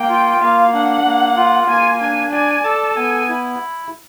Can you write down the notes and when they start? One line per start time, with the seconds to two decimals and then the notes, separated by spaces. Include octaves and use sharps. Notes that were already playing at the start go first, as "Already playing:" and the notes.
Already playing: A#3 G5
0.09 F4
0.41 A#3 F5
0.74 D4 F#5
1.05 A#3
1.37 F4
1.69 A#3 G#5
2.01 D4 G#5
2.32 D5 G#5
2.65 A4 A5
2.97 B3 G#5
3.29 E4